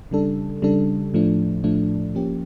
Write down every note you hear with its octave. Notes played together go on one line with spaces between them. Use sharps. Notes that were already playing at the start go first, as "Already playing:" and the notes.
C#3 G3 D4 A4
C#3 G3 D4 A4
A2 F3 A3 D4
A2 F3 A3 D4
F3 A#3 C#4 G4